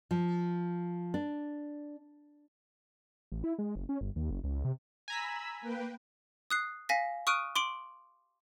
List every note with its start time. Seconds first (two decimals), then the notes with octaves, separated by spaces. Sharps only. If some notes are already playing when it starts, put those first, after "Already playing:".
0.11 F3
1.14 D4
3.32 A1
3.44 E4
3.59 G#3
3.75 F#1
3.89 C#4
4.01 G1
4.16 D#2
4.31 F#1
4.44 C#2
4.65 C3
5.08 G#5 A#5 B5 E6 B6
5.61 A#3 B4 G5
6.50 D#6 F#6 C7
6.89 F5 G#5 A#6 B6
7.27 C#6 D#6 F6 F#6 D7 D#7
7.56 C6 D6 D7 F#7